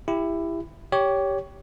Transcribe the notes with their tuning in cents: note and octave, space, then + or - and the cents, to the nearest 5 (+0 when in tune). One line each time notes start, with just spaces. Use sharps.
E4 +10 G4 +20
G4 +0 C#5 +15